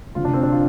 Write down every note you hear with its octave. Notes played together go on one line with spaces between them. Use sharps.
F1 F2 D3 F4
D4
C4
D4
F4